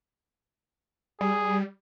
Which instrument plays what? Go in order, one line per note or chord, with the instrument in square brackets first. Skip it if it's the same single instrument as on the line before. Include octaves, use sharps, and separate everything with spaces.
[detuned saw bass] G3 [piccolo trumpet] G#4